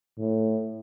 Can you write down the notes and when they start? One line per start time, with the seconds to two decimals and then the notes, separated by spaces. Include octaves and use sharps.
0.18 A2